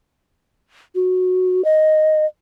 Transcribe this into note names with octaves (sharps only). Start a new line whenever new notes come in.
F#4
D#5